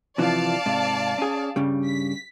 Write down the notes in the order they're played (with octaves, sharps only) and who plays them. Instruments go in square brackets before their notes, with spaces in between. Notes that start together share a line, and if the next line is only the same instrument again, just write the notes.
[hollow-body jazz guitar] C3 E3 F3 [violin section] D5 F5 A5
[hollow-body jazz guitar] G#2 C3
C#4 G#4
G2 C#3 G3
[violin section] B6